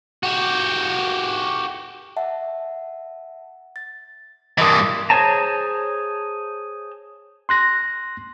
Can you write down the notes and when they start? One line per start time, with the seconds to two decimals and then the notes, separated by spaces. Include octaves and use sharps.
0.23 F#4 G4
2.17 E5 F#5 A5
3.76 A6
4.58 G2 E3 A#4 D#5 A5 C6 D6 D#6
5.10 G#4 C5 C#5 A5 A#5
7.49 C6 F#6 A#6